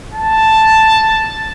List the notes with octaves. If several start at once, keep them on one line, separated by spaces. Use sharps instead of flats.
A5